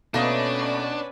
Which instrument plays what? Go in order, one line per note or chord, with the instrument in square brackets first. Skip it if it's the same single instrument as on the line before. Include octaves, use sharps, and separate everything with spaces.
[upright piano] B2 [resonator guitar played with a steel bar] A3 A#3 D#5 [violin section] C#4 B4 D5 [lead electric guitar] D4